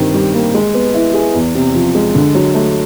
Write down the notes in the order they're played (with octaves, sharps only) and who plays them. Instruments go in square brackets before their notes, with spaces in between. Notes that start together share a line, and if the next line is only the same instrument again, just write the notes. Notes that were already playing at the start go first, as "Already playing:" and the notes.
Already playing: [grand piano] G2 D#3 C4
G3
A#3
G#3
B3
E4
G#4
E2
C3
F3
G#3
D3
F#3
A3